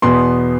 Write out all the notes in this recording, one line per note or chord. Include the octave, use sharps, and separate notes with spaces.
E2 B2 B3 C6